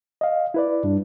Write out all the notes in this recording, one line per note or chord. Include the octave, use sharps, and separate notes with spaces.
D#5 F5
E4 B4 D5
G2 G3 D4